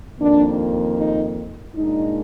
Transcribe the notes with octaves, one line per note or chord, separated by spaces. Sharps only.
F2 D#3 A#3 D4
D#4
A#2 G#3 D4 D#4